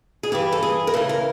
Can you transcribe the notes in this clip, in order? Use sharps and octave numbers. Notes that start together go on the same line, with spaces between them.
G#4
G2 E3 G4
A4
G#4
A#4
D2 C#3 E3 A4
A#4